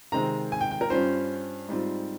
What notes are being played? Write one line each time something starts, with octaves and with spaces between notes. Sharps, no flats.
C3 D#3 G#3 C4 A#5
G#5
G5
G5
A#4
G2 G3 C#4 F4 C5
G#2 G3 C4 F4